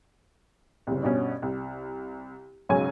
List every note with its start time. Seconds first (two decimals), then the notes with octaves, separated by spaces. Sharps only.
0.87 F#1 C2
1.03 G2 B2 C#4
1.42 C2
2.69 B1 G#2 C#3 F#3 C#5 G#5